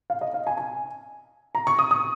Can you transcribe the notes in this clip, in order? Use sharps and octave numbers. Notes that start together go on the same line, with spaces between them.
F5
D#5
F5
G#5
G#5
A#5
C#6
D#6
D#6